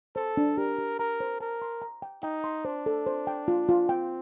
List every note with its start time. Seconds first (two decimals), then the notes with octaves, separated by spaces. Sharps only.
0.16 A4 C5
0.37 D4
0.58 G4 A#4
0.79 G4
0.99 A#4 A#5
1.20 C5
1.40 A#4 A5
1.62 C6
1.82 A#5
2.02 G5
2.23 D#4 G5
2.44 C6
2.65 D4 C5
2.86 A4
3.06 C5
3.27 G5
3.48 F4
3.69 F4
3.89 C4 G5